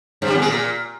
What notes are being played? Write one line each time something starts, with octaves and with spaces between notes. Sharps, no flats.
G2
G3
E2
G#3
A#2